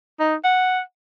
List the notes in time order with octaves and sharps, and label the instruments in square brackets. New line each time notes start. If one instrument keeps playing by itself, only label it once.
[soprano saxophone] D#4
F#5